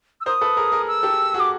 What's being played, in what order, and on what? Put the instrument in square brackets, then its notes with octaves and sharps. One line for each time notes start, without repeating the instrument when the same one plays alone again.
[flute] E6
[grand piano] A#4 C5 [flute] D#6
[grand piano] A4 B4
G#4 A#4
G#4 A#4
[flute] E6
[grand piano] G4 A4
F#4 G#4
[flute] D6